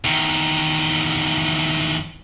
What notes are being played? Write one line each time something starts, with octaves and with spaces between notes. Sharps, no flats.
E2 D#3